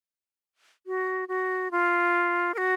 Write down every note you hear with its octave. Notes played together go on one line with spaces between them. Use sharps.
F#4
F#4
F4
A#4
F#4